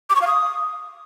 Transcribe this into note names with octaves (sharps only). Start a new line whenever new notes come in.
D6
C#6
F5
D#6